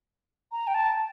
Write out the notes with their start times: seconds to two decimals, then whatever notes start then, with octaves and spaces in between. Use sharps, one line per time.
0.52 A#5
0.67 G5
0.74 A5